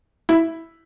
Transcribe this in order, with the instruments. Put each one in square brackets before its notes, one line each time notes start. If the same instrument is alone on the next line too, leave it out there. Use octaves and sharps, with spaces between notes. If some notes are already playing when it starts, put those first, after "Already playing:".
[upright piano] E4